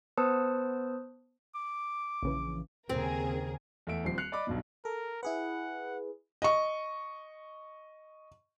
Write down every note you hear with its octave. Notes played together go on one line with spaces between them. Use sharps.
B3 B4 C5 A5 D#6 E6
D6
A#1 C#3 E3
D#2 C#3 C4 G#4 A#4
E2 A3 E5 D7
D#1 F3 C4 C7
F#6 C7 C#7 F7
D5 D#5 B5 D6
B1 G2 B2
A4 A#4
E4 G#4 B4 F#5
D#5 C#6